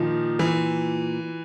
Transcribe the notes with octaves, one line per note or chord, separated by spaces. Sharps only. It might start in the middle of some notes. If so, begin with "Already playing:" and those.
Already playing: A#2 D#3 F3
E3